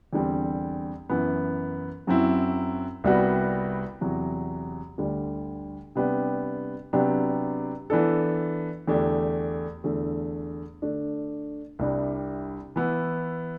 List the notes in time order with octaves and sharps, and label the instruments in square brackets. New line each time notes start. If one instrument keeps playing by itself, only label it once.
[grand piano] E2 D3 G3 C4
F#2 E3 B3
F#2 F#3 C4 E4
C2 C3 G3 B3 F#4
E2 C3 F#3
D2 D3 G3
C3 G3 B3 D4 G4
C3 F#3 B3 D4 G4
E3 B3 D4 A4
E2 D3 A3 D4 G4
E2 D3 A3
D3 A3 D4
C2 C3 G3 D4
E3 B3 E4